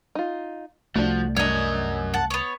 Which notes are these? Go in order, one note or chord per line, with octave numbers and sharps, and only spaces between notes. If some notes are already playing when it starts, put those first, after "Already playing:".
D#4 F4
C2 F3 A3 D4 F#4
F#2 G3 D4 A#4 C#5 D#5
F#5 A5
B3 C#5